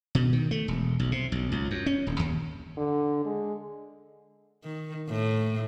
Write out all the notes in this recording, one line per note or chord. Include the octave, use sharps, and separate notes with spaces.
B2
D#3
A3
E1
B1
C3
B1
C#2
F#2
C#4
D#1
D#2
D3
G#3
D#3
A2